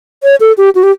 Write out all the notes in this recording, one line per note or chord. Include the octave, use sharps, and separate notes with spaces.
C#5
A4
G4
F#4
G4